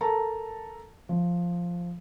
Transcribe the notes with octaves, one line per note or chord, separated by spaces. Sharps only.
A4 A#4 A5 A#5
F3